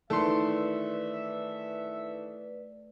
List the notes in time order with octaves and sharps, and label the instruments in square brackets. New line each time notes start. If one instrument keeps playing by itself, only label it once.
[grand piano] D#3 E3 A4 [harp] A3 C6 [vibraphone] B4 D5 [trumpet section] E5